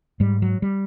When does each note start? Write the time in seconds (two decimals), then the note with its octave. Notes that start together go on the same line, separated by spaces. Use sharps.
0.20 G#2 G3
0.42 F#3
0.62 G3